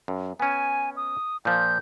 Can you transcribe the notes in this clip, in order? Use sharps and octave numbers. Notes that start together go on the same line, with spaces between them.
F#2
B3 C#4 G#5
D#6
A#2 F3 G6